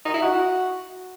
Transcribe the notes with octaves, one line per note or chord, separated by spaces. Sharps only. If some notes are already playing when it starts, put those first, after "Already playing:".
D#4
E4
F#4